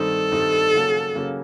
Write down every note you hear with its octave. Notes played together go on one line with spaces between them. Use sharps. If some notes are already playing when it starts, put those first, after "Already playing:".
Already playing: G2 D#3 G3 C4 D#4 A4
G2 D#3 G3 C4 D#4
C#3 F#3 A#3 C#4
C#3 F#3 A#3 C#4